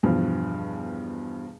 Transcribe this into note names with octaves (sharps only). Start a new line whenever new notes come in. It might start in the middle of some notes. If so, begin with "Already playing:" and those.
E2 G2 B2 F3